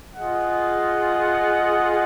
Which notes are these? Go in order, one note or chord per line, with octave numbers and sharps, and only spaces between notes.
F4 G#4 D#5 F#5